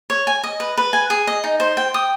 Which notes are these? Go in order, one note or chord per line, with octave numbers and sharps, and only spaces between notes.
C#5
G#5
D#5
B4
B4
G#5
G#4
D#5
D#4
C5
G5
D#6